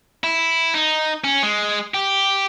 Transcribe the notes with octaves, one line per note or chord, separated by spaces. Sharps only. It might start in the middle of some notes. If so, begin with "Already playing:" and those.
E4
D#4
C#4
G#3
G4